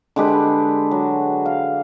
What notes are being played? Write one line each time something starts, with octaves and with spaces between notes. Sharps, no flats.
D3 G#3 G4 B4
F#3
F5